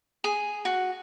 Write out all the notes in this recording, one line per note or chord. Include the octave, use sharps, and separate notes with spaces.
G#4
F#4